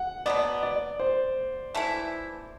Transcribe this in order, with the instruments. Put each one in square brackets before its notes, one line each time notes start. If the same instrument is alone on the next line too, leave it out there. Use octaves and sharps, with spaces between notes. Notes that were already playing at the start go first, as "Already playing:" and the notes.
Already playing: [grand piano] F#5
[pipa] B2 F#3 B3 [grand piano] D5
[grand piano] D5
C5
[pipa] E3 A3 E4